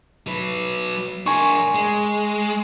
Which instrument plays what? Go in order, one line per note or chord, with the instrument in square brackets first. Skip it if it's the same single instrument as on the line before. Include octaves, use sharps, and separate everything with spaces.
[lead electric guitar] F#3 B4
[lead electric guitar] D4 A#4 [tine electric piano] G#5 C6 C#6
[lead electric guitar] G#3